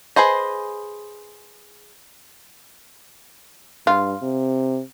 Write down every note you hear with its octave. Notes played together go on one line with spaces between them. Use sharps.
G#4 B4 C5 D#5
G2 F4
C3